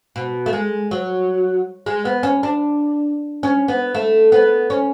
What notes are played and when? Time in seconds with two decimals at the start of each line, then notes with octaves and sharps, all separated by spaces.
0.16 B2
0.46 A3
0.53 G#3
0.91 F#3
1.86 G#3
2.05 B3
2.23 C#4
2.43 D4
3.43 C#4
3.68 B3
3.95 A3
4.32 B3
4.70 C#4